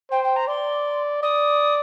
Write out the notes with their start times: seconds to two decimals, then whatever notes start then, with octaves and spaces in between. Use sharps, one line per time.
0.11 C5 G5
0.24 G5
0.36 A#5
0.48 D5 C6
1.22 D5 D#6